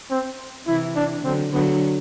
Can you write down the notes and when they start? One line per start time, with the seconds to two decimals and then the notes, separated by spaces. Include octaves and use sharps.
0.11 C4
0.67 C3 E3 E4
0.96 D4
1.24 D3 F#3 C4
1.52 D3 F#3 B3